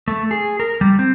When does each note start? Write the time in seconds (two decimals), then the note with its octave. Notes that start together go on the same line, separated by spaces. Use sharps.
0.08 A3
0.31 G#4
0.60 A#4
0.81 G3
0.99 C4